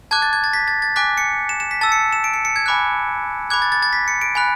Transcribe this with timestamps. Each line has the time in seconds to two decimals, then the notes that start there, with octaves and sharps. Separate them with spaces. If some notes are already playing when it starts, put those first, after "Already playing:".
0.11 A5 D6 F#6 G#6
0.22 A6
0.33 G#6
0.44 A6
0.53 B6
0.68 A6
0.82 A6
0.96 G#5 D6 F#6 B6
1.18 C#7
1.49 E7
1.60 E7
1.71 B6
1.81 A5 E6 A6
1.92 C#7
2.13 E7
2.24 D7
2.34 C#7
2.45 C#7
2.56 G#6
2.66 G#5 B5 D6 F#6
3.50 B5 D6 F#6 G#6
3.62 A6
3.72 A6
3.83 A6
3.93 B6
4.08 C#7
4.21 D7
4.35 G#5 B5 F#6